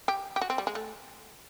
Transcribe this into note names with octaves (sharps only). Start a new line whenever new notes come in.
G4
G4
F#4
C4
G3
G#3
A3